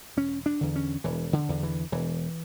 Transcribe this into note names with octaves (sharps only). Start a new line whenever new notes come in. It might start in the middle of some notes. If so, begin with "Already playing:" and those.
E1 C#4
D4
E2 D3
C#4
E1 E3
D3
E2 D3
E3
E1 E3